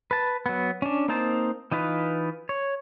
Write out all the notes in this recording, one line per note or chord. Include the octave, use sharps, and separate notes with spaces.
B4 A5
F#3 B3
C#4 D4
A#3 C4 D#4 C5 A5
E3 D#4 F4 B4
C#5